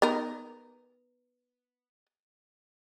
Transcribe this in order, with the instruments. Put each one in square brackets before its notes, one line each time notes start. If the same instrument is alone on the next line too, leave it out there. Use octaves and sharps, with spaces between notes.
[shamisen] B3 D#4 A#4